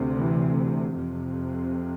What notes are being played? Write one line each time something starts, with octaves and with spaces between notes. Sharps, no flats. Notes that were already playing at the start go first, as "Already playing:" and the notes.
Already playing: D2 C3
E3
F2 C3